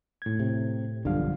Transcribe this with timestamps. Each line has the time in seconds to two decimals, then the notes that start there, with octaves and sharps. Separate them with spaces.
0.22 A2 G#6
0.40 C3
1.05 B1 G2 D3 F3 G3 F5